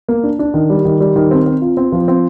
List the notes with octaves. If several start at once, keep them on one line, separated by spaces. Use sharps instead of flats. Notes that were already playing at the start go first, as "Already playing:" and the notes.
A#3
D4
D4
D#3
G3
D#3
G3
D#3
C4
C4
F4
C4
F3
C4